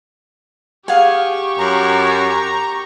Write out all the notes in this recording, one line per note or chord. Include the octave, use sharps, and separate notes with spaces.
G4 G#4 F5 F#5 G#5 C#6
F#2 A#5